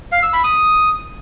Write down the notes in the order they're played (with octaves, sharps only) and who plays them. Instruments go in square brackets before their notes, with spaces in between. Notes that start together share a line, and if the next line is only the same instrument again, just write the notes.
[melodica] F5
E6
B5
D#6